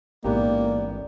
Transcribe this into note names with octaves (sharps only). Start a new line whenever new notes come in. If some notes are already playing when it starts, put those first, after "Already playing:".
A1 G#2 A#3 B3 G4 D5